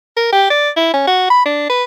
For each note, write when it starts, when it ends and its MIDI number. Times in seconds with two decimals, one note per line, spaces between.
0.17 0.29 70
0.33 0.48 67
0.51 0.70 74
0.77 0.93 64
0.94 1.03 61
1.08 1.30 66
1.30 1.43 83
1.46 1.69 62
1.70 1.84 71